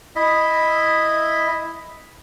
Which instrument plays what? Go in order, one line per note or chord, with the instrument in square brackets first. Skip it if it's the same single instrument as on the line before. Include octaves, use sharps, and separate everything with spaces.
[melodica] E4 D#5 E5